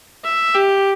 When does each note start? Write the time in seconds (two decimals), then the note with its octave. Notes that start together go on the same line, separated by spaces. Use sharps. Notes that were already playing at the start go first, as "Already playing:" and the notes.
0.24 E5
0.55 G4